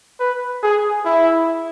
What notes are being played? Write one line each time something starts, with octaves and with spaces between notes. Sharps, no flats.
B4
G#4
E4